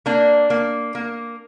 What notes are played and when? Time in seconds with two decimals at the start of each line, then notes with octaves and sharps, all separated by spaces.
0.06 A#3 D4
0.50 A#3
0.95 A#3